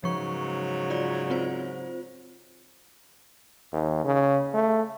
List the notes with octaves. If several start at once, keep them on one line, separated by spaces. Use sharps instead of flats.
G#2 C#3 F3 F#3 C#6
F4 D5
C4 F4 C5
D#2
C#3
A3